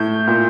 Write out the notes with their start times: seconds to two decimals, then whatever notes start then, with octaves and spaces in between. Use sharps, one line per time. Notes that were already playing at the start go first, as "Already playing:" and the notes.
Already playing: A2 G6
0.28 A#2